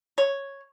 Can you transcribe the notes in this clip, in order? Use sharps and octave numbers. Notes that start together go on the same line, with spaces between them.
C#5